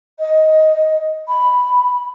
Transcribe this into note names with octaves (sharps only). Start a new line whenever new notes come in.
D#5
B5